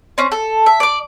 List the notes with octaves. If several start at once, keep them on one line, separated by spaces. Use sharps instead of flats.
C4 C#4
A4
E5
D5 D6